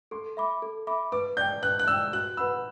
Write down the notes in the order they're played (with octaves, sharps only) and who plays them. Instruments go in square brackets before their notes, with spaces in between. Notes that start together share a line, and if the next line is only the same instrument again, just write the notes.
[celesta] A4 [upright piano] C6
[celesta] E5 B5 D6
A4
E5 B5 D6
[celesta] B4 [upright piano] D6
[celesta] D5 G5 [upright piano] G6
[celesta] B4 [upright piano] F#6
[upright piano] F#6
[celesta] D5 [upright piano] E6
[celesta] G5
[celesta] F#4 [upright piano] F#6
[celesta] B4 F#5 B5 [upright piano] E6